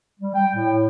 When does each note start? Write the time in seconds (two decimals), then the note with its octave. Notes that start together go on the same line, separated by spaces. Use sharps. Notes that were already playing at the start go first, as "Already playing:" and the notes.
0.20 G3
0.34 G5
0.55 A2